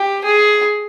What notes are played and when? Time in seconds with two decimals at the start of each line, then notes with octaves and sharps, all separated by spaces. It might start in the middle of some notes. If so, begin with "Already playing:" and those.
Already playing: G4
0.24 G#4